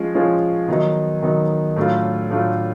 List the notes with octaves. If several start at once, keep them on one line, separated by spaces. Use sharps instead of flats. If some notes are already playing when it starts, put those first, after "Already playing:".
Already playing: F3 G#3 C#4 F4
F3 G#3 C#4 F4
D#3 F#3 B3 D#4
D#3 F#3 B3 D#4
A2 F#3 A3 D4 F4
A2 F#3 A3 D4 F4